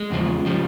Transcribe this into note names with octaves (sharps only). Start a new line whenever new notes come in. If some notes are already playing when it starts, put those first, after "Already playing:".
Already playing: G#3
E2 C#3 F3
C#3 F3 G3